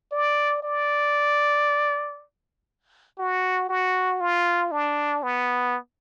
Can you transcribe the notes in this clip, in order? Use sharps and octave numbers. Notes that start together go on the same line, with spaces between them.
D5
D5
F#4
F#4
F4
D4
B3